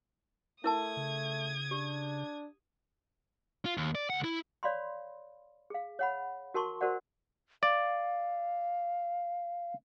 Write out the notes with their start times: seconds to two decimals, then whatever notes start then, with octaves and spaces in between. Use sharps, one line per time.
0.64 A3 E4 A#4 A5 D#6 G#6
0.97 C#3
1.71 D4 G4
3.65 F4
3.77 D#2
3.95 D5
4.10 C#2 F#5
4.24 E4
4.63 C#5 D5 F5 B5 C6
5.70 G#4 F5
5.99 C#5 F#5 B5
6.54 F#4 A#4 A5 C6 C#6
6.81 F#4 A#4 C5 D5 F#5
7.63 D5 F5